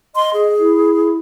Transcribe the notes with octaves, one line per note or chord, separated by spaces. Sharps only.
D#5 C6
G#4
E4